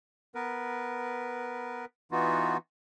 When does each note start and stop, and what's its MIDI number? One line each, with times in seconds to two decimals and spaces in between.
0.35 1.85 59
0.35 1.85 70
0.35 1.85 71
2.11 2.57 52
2.11 2.57 59
2.11 2.57 63
2.11 2.57 65
2.11 2.57 66